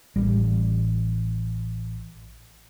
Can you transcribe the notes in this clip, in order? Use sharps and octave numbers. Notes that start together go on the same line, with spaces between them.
A1 G3